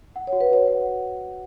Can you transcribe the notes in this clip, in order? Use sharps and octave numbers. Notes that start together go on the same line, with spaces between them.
F#5
C#5
F#4
B4
F#4 C#5
F#5